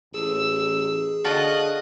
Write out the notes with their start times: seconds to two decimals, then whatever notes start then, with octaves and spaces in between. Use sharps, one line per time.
0.14 A1 G#4 E6
1.24 D3 F#4 D#5 F5 A5 F#6